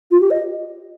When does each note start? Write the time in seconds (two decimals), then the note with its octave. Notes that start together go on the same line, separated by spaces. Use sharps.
0.11 F4
0.21 G4
0.30 D#5